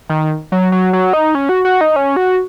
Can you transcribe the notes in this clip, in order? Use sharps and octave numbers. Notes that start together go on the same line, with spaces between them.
D#3
F#3
F#3
F#3
D#4
C#4
F#4
F#4
D#4
C#4
F#4